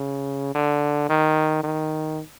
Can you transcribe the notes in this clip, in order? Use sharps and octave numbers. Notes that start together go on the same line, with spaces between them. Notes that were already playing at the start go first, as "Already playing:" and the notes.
Already playing: C#3
D3
D#3
D#3